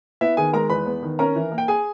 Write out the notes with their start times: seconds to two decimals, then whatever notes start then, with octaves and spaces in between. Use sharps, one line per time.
0.21 B3 E4 E5
0.37 D#3 G#4 G#5
0.53 G#3 A#4 A#5
0.70 E2 B4 B5
0.86 B3
1.03 D#3
1.19 C#4 A#4 A#5
1.36 E3
1.52 A#3
1.58 G5
1.68 G#4 G#5